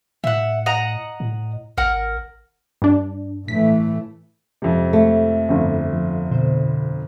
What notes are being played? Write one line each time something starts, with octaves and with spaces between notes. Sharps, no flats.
A2 E5 F#5
D#5 F#5 A#5
A2
G#1 A#4 F#5
G2 D4
A2 E3 A3 B6
F2 C3 G#3
A3
G1 F2
F3
B2 D3 C5